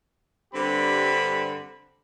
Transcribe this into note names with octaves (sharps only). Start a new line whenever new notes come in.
G2 D3 G3 C4 G4 B5